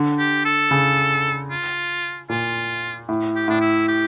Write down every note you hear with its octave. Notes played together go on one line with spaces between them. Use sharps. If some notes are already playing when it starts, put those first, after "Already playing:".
Already playing: D3
G4
A4
C#3
F4
A#2 F4
A2
G4
A2 D4
E4
G4